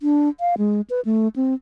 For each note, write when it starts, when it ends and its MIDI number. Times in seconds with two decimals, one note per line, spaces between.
0.01 0.29 62
0.40 0.55 77
0.58 0.81 56
0.90 1.00 71
1.05 1.28 57
1.36 1.54 60